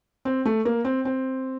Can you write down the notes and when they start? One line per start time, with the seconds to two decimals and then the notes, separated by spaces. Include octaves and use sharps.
0.25 C4
0.45 A3
0.65 A#3
0.85 C4
1.05 C4